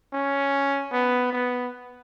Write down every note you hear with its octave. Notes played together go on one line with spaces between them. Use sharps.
C#4
B3
B3